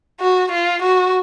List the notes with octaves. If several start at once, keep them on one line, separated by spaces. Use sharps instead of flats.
F#4
F4
F#4